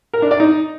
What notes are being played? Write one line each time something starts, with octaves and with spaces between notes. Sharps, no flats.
A#4
D4
D5
D#4